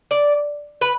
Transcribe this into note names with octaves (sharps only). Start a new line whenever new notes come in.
D5
B4